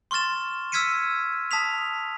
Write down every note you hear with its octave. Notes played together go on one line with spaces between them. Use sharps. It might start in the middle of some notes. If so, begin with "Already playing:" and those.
C6 C#6 F6 A6 E7
E6 F6 G#6 B6 C#7 D#7
A5 D#6 B6 F7